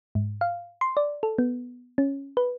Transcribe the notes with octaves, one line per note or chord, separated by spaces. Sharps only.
G#2
F5
C6
D5
A4
B3
C#4
B4